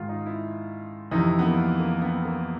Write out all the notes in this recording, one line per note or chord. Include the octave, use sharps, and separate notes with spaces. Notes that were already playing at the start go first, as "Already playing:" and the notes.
Already playing: G#2 D#3 F4
D#4
E4
F2 C3 E3 D#4
B3
A#3
A#3
B3
A#3